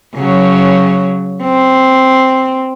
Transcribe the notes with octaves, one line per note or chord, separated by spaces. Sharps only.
C#3 F#3
C4